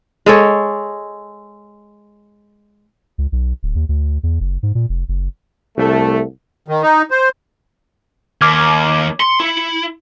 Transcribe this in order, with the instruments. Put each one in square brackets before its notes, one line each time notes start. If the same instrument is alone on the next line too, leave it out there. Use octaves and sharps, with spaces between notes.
[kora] G#3 A4 C#5
[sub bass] C#2
B1
D1
D#2
D2
E2
F#1
G#2
A#2
F1
F#1
[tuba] C2 [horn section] A3
[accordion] D#3
D#4
C5
[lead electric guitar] D#2 [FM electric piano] D6 F6 G#6
[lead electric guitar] C6 [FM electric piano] C#7
[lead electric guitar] E4